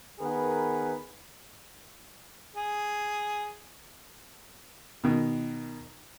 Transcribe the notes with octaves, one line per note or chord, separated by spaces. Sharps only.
D#3 B3 G#4 A#4 B4
G#4
B2 D#3